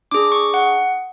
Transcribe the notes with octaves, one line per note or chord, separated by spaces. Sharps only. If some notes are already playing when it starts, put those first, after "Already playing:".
D4 G#4 D6
C#6
F#5